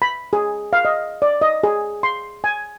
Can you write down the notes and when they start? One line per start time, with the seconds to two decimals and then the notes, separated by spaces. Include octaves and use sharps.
0.02 B5
0.33 G#4
0.73 F5
0.85 D#5
1.22 D5
1.42 D#5
1.63 G#4
2.03 C6
2.44 G#5